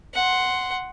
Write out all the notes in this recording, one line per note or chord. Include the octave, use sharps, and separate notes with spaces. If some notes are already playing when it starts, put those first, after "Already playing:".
F#5 C6